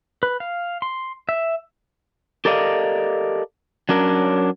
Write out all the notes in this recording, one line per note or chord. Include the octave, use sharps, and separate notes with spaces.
B4
F5
C6
E5
G4 A4 A#4 D5 D#5 F5
F#3 C#4 D4 A#4